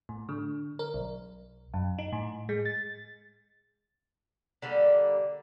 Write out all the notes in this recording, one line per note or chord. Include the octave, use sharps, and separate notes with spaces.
A2
D3
A#4
B1
F#2
D#4
A2
G#3
A6
D3 G3 A#3